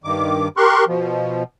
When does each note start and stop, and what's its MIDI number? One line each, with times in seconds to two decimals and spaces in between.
0.04 0.48 43
0.04 0.48 51
0.04 0.48 86
0.57 0.85 67
0.57 0.85 70
0.57 0.85 84
0.57 0.85 85
0.57 0.85 90
0.88 1.43 47
0.88 1.43 53